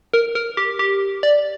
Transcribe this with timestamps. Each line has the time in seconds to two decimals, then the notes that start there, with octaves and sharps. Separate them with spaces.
0.14 A#4
0.35 A#4
0.57 G4
0.79 G4
1.23 D5